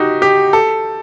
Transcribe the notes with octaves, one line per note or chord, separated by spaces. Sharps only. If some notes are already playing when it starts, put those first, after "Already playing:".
Already playing: D#4 F#4 G4
G4
A4